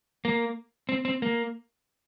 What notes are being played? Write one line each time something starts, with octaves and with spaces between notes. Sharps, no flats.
A#3
C4
C4
A#3